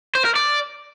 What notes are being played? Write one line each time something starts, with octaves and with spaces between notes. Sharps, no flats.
C5
A#4
D5